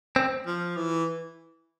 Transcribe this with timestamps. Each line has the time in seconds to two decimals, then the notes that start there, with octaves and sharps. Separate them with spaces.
0.16 C4
0.46 F3
0.77 E3